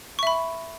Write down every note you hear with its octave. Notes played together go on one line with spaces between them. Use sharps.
E5 B5 C#6